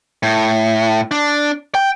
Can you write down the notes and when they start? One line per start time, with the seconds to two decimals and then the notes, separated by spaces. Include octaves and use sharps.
0.23 A2
1.11 D4
1.75 G5